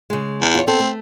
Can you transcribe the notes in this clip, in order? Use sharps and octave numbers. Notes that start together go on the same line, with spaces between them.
C#3 G#3
E2
F4 C#5
B3 C4 A4
A3